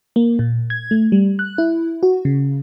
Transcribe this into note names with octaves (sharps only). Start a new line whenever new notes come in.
A#3
A#2
G#6
A3
G3
F#6
E4
F#4
C#3